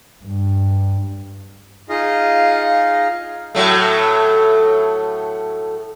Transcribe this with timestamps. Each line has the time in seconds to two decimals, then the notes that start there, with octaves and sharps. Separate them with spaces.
0.25 G2
1.89 D#4 F4 G#4 D#5 F5
3.55 A2 F#3 A3